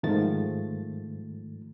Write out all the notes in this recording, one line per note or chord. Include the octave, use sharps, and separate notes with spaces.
G#2 D#3 F3 A3 A6